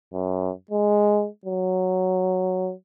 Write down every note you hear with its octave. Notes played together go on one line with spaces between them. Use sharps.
F#2
G#3
F#3